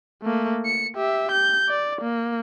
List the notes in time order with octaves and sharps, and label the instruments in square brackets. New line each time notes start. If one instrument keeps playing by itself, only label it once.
[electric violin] A3 A#3
C#7
G4 E5
G6
D5
A#3